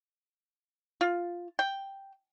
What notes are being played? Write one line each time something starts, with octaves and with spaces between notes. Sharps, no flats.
F4
G5